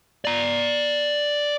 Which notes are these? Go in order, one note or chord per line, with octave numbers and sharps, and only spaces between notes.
D5 A#5